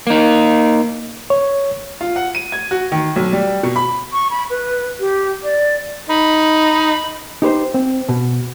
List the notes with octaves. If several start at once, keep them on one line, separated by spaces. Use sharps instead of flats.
A#3 D#4
C#5
F4
F#5
D#7
G#6
F#4
D#3
B1
G3
B2
B5
C#6
B5
B4
G4
D5
D#4 B5
D#4 G4 B4 C5
C4
B2